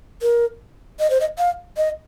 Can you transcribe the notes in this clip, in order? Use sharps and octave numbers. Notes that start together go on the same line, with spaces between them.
A#4
D#5
C5
D#5
F5
D#5